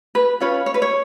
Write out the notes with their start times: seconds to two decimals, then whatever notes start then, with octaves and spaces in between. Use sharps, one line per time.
0.15 B4
0.40 C#4 F4 B4 C#5
0.66 C#5
0.74 B4
0.82 C#5